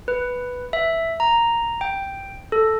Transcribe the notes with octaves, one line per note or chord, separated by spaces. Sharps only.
B4
E5
A#5
G5
A4